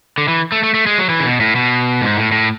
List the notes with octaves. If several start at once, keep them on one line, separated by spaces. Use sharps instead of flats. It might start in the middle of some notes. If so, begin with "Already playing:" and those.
D3
E3
A3
A3
A3
G#3
F#3
E3
C#3
B2
A2
B2
G#2
A2
A2